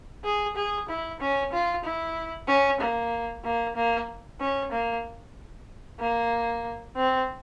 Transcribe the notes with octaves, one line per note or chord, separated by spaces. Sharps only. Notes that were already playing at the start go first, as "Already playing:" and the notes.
G#4
G#4
E4
C#4
F4
E4
C#4
A#3
A#3
A#3
C#4
A#3
A#3
C4